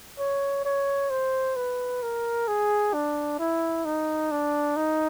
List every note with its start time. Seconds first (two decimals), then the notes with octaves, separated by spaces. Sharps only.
0.19 C#5
0.65 C#5
1.10 C5
1.56 B4
2.02 A#4
2.48 G#4
2.94 D4
3.39 E4
3.85 D#4
4.31 D4
4.77 D#4